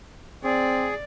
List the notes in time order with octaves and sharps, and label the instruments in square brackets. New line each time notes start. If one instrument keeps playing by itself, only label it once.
[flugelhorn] C4 [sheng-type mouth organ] G#4 [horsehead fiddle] D5